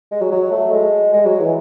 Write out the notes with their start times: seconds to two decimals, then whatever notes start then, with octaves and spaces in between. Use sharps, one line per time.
0.12 G#3
0.21 F#3
0.32 F#3
0.51 A3
0.72 G#3
1.13 G#3
1.26 F#3
1.40 E3